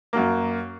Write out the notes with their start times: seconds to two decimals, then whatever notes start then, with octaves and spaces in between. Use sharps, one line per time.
0.13 F#2 F#3 A#3